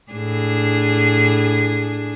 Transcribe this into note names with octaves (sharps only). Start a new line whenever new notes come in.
A2 D4 G#4